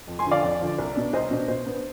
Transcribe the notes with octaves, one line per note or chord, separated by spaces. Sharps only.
F2
G#5 C6
D3 F3
D5 F5
F2 D5
D3 F3
C2
B2 B3 D4
C2 C5 D#5
B2 B3 D4
B2 C5
B3 D4